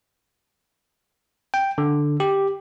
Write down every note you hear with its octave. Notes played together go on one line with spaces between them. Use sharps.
G5
D3
G4